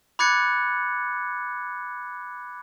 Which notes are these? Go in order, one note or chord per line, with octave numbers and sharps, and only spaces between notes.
B5 D6 F#6 G#6 A6 C#7